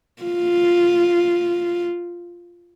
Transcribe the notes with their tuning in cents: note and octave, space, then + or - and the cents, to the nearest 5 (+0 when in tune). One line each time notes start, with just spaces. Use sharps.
F4 +0